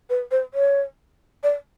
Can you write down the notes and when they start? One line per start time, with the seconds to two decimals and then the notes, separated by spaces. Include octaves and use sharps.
0.10 B4
0.31 C5
0.54 C#5
1.43 D5